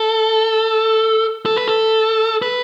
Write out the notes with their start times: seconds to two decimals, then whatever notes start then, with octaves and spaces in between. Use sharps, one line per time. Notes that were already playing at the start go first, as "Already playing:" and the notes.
Already playing: A4
1.46 A4
1.57 B4
1.68 A4
2.42 B4